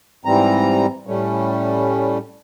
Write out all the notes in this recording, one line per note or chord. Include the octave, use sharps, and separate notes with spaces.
G#2 E3 G3 C4 A#5
A2 G3 A3 C#4